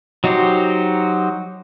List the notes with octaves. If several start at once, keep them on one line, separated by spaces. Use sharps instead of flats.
F#3 D#4 F#4 G4 C5